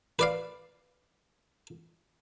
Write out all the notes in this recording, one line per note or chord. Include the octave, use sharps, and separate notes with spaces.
B4 D5 F5